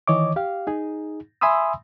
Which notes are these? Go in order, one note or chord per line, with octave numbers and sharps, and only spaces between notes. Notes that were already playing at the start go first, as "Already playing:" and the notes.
D#3 E3 C#5 D#5 D6
G4 F5
D#4 G#4
E5 G#5 B5 C6 D#6 E6